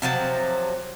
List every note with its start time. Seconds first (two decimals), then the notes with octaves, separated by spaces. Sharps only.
0.02 C3 F3 F#3 A5